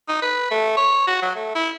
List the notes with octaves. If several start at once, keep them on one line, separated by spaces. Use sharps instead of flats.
D#4
B4
A3
C#5
F#4
F#3
A3
E4